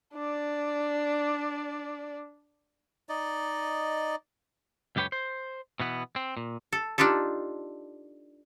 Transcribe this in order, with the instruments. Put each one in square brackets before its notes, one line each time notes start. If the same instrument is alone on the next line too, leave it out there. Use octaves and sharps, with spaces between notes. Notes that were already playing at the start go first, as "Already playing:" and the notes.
[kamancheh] D4 D5
[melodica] D#4 D5 D#5
[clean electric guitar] C#2 F#2 G4 B4 C#5 G5
C5
B2 E3 B3
C4
A#2
[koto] A4
D4 D#4 F4 G4 A4